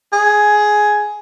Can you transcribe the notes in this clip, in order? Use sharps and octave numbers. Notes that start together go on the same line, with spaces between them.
G#4